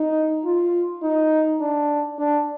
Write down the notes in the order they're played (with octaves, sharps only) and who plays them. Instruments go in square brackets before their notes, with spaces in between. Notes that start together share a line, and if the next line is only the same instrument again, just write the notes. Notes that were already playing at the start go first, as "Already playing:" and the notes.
Already playing: [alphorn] D#4
F4
D#4
D4
D4